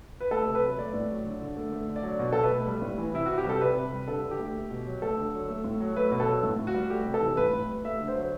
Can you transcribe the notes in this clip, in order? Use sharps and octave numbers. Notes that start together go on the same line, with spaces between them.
B4
A3 A4
C3
B4
F#3
A3 D5
A2
F#3
D3
D3
A3
A3
D3
D5
F#3
B2
B2 A4
B4
A3
G3
A2
E3
C3 E4
C3 F#4
G4
G3 A4
C3 B4
C3
G3
D3 A4
D3
G4
A3
A3
B2
F#3
A3 A4
D3
F#3
A3
A2
F#3
A3 B4
B2
A4
F#3
A2
A2
F#4
G3
A3 G4
C3
A4
E3
A2 B4
A2
G3
A3 E5
D3
C5
F#3